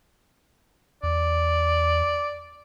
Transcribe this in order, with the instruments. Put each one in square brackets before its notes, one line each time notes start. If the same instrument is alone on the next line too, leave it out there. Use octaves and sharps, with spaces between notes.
[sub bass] E2 [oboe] D5